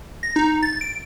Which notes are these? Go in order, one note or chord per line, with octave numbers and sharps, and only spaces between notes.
A#6
D#4
A6
D7